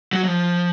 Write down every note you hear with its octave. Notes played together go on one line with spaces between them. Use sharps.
F#3
F#3
F3